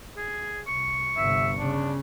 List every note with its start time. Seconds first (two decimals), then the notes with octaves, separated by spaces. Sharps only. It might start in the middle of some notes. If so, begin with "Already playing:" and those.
0.16 G#4
0.67 C2 C#6
1.17 G1 C3 E5
1.58 C#3 D4